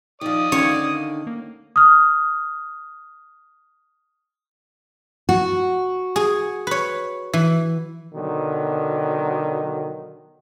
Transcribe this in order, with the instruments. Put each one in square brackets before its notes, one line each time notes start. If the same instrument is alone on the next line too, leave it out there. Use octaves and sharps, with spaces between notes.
[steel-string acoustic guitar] D#3 F3 [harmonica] D5 D#6
[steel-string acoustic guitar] D3 D#3 [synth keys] C#4 F5 [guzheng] C#5
[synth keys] A#3
[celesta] D#6 F6
[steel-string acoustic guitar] F#4
[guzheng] G#4
B4 C#5
E3
[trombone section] B2 D3 D#3 F#3